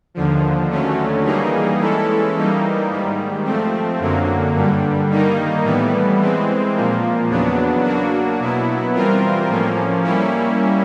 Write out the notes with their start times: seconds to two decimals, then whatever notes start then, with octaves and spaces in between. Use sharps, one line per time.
0.14 D#2 D3 F3
0.70 D#2 D3 F#3 A3 C#4
1.24 E3 G3 A#3 D#4 G#4
1.80 E3 G#3 C#4 E4 A4
2.35 E3 G3 A#3 D#4
2.90 G#2 D#3 G3
3.44 F3 A3 C4
4.00 F#2 D3 F#3 A#3
4.54 G2 D3 G3
5.09 D#3 G3 A#3 D#4
5.64 A2 E3 G3 B3
6.19 E3 G#3 C4
6.74 A#2 F3 A#3
7.29 E2 C#3 F#3 B3 D4
7.84 F#3 A#3 D4 F#4
8.39 B2 F#3 B3 E4
8.94 E3 G3 C4 F4 A#4
9.49 A2 F3 A#3 C#4
10.03 G3 A#3 C#4 E4